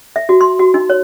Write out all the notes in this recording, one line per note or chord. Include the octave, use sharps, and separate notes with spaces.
E5
F#4
C6
F#4
D#4
C#5